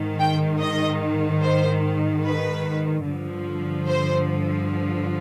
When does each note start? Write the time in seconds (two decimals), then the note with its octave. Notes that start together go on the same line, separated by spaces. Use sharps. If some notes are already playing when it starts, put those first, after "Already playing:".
Already playing: G#2 D#3
0.19 G5
0.60 D#5
1.42 C5
2.24 B4
3.05 G2 D3 F3
3.87 C5